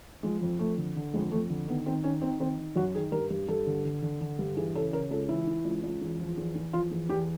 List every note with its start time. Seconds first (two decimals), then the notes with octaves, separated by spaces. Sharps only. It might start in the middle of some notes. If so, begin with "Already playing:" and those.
0.23 F3 G#3
0.41 F2
0.59 F2 A3
0.77 D3
0.96 D3
1.14 F2 G#3
1.31 F2 A3
1.50 D3
1.68 D#3 B3
1.86 D#3 C4
2.04 D#3 C#4
2.22 D#3 C4
2.39 D#3 C4
2.58 D#3
2.76 F#2 F#4
2.95 D#3 G#4
3.12 G2 A#4
3.30 G2
3.48 G2 A4
3.67 D3
3.84 D3
4.02 D3
4.21 D3
4.39 G2
4.56 E3 G#4
4.75 C#3 A4
4.93 C#3 A#4
5.10 C#2 A4
5.29 E3 E4
5.47 E3
5.65 C#2
5.83 C#2
6.01 E2
6.20 F3
6.37 E2
6.55 E2
6.73 F3 F4
6.91 E2
7.09 E2 G4